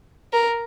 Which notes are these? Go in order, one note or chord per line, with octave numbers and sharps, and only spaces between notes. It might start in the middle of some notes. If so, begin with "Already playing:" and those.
A#4